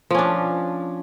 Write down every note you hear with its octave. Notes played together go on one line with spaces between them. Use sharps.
F3 C#4 D4